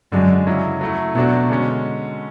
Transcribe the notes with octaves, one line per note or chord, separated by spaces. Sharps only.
F#2 D3 G#3 D4 F#4
C#3 F#3 C#4 E4
F#3 A3 E4
B2 F#3 A3 D4 F#4
D3 G#3 C#4